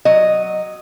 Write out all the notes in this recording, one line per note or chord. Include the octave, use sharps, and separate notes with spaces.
F#3 D#5